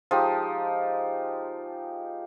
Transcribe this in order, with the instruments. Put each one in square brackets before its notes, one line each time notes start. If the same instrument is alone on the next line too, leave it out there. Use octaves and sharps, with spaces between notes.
[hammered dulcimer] F3 [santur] G#3 D#4 G4